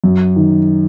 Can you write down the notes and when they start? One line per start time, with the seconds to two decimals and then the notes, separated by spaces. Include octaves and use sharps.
0.04 F#2
0.36 D#3